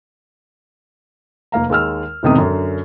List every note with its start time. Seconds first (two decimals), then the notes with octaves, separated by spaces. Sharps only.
1.52 F1 A#3 F5 A#5
1.70 D#2 G#3 E6 F6
2.23 E1 A2 C3 D#3 B3 D#6
2.38 F#2 D3